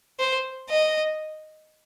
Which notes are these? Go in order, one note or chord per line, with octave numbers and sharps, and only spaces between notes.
C5
D#5